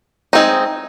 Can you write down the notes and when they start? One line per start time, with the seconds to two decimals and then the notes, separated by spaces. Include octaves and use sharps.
0.33 G#3 C4 D#4